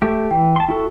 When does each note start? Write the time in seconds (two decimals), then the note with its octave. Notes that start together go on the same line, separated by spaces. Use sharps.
0.02 A3 G4 G6
0.31 E3 G5
0.56 A5 C6
0.69 E4 F#4 A4